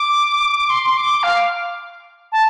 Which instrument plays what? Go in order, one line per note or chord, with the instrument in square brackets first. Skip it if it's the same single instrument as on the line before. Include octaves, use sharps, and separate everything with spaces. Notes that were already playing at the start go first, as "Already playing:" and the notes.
Already playing: [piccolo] D6
C6
D6
F5
A5